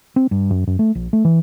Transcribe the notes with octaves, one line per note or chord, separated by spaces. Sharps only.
C4
G2
F#2
F#2
A3
A#1
A3
E3